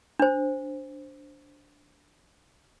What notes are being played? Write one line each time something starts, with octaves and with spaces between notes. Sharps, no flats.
D4 C5